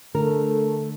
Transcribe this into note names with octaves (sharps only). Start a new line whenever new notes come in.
D3 A3 A#4